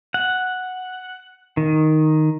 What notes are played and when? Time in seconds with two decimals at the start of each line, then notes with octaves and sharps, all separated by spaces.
0.14 F#5
1.57 D#3